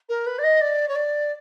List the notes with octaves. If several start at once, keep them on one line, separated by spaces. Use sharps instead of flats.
A#4
B4
D5
D#5
D5
C#5
D5